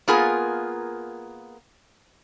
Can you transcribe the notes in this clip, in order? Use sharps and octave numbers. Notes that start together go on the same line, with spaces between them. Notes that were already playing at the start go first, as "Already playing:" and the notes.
A#3 B3 F4 G#4 A#4 G#5